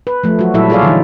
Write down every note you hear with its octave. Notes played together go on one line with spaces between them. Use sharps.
B4
F3 A3
F#3 F#4
A#2 F#3 G3 E4 A4 E5
F4 G#4 A4 C#5 D5 F5
D3 E3 D#4